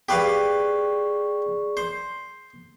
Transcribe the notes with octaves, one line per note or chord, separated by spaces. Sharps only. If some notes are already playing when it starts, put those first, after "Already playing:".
G4 G#4 B4 D5 F5 C#6
C5